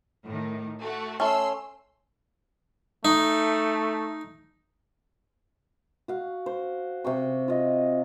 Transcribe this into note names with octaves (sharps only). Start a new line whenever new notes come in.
A2 D#3
A3 F#4
A3 C#4 C6 E6
A3 D#4
F#4 F5
C5
C3 G5 C#6
F4 D#5